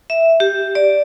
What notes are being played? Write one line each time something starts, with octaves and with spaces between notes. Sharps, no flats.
E5
G4
D5